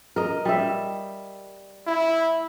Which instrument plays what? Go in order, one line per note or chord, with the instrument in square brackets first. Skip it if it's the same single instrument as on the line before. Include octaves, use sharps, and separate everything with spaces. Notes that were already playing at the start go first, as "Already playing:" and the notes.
[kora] A#4 D#5
G3 D#5 E5
[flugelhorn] E4